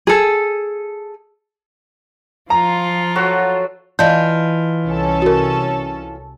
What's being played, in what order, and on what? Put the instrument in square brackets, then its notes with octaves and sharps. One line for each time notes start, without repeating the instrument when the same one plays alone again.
[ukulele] G#4 A4
[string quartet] F3 F4 [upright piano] A#5
[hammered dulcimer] F#3 F#4 A4
[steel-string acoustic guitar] E3 F4 [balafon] D5 F5 [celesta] D#5 A5 G6
[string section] C2 C#4 A4
[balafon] F#4 A#4